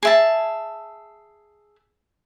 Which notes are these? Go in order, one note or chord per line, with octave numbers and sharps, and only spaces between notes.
G#4 E5 A5